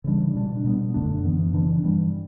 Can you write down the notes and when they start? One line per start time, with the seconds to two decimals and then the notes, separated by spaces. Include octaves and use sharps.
0.04 C#3 E3 G3 D4
0.35 B2 G3 D4
0.64 B2 G3 B3
0.94 F#2 D3 A3 D4
1.24 F#2 E3 B3
1.53 C#3 E3 B3 D4
1.83 G2 E3 G3